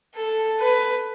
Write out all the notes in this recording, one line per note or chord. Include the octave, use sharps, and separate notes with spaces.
A4
B4